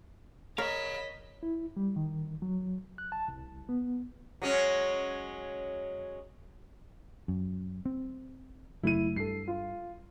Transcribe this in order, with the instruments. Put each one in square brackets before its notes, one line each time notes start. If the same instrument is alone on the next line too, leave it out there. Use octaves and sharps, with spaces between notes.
[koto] A#4 [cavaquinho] C#5 [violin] D#5 B6 [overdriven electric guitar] F5 B5
[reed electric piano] E4
G3
D#3
F#3
F#6
A5
C2
B3
[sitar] F#3 G#3 C#4
[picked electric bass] F#2
C4
[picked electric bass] F#1 F#2 A3 [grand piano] E4 D#7
[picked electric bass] G2 [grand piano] A4 C7
[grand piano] F4